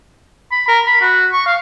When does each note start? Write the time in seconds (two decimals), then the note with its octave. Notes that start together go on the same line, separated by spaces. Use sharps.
0.52 B5
0.68 A#4
0.86 B5
1.02 F#4
1.32 C#6
1.46 F5